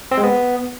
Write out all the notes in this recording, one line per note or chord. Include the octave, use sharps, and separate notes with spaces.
C4
G#3
B3